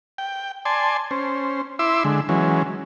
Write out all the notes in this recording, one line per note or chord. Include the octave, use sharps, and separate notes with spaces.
G5
D5 G#5 A5 C6
C#4 C5
E4 E5 C6 D6 E6
D3 G#3
E3 F#3 G#3 C#4